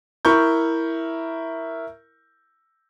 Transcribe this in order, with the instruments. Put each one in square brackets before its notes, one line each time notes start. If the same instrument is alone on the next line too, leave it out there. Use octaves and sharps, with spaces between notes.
[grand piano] E4 A#4 C#6 G6